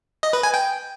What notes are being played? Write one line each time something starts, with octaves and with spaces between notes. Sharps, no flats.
D#5
B4
G#5
G5